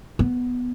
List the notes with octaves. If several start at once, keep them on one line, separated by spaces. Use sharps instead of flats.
B3